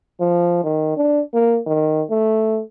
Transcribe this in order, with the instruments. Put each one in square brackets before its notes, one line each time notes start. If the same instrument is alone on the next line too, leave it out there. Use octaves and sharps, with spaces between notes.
[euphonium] F3
D#3
D4
A#3
D#3
A3